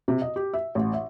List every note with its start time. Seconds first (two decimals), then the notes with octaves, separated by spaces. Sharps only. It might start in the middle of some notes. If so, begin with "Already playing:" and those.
0.08 C3
0.22 D#5
0.36 G4
0.54 E5
0.75 A1
0.94 E5